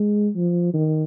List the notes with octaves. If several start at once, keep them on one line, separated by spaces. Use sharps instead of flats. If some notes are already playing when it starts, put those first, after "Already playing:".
Already playing: G#3
F3
D#3